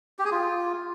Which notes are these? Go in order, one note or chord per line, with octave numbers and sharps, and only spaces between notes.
G4
G#4
F4